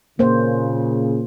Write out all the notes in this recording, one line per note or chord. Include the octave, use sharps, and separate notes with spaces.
A#2 C#3 A#3 C5